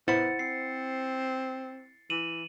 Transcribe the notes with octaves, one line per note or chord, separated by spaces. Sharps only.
B3 E4 C5 F#5 A6 C#7
C4 C7
E3 D#7 E7 F#7